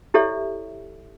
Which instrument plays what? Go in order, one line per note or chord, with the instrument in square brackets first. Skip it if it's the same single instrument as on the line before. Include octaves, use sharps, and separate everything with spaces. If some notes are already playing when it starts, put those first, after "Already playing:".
[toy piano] E4 G4 A4 C#5 D5 E5